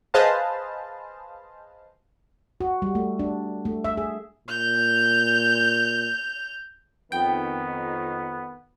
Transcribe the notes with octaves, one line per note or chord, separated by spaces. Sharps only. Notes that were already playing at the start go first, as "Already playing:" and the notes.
G#4 B4 C5 D#5 F5 A5
F#4
G3
A3
D4
A3
E5
G#4
A#2 G6 F7
F2 D#3 B3 G5